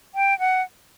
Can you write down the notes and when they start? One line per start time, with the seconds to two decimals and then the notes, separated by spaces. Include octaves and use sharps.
0.15 G5
0.39 F#5